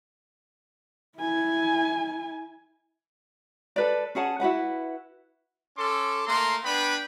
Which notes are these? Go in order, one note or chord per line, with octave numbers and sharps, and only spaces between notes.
E4 G#5
A4 B4 D5
C#4 G#4 F#5 A5
E4 F#4 B4 F#5
C#4 A4 C6 D6
A3 A#3 A#5 C6
B3 D4 B4 G5 B5